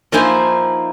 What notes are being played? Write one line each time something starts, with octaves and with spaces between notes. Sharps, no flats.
F3 A#3 D#4 E4 C5 G#5